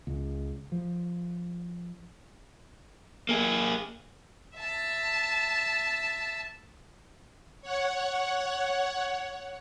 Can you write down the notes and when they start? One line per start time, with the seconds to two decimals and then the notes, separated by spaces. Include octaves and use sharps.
0.07 C#2
0.72 F3
3.29 A#3 G#4
4.58 E5 A5
7.62 C#5 F#5